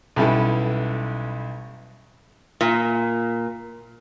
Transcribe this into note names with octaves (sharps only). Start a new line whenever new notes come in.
B1 G3 C#4 E4 A4 B4
A#2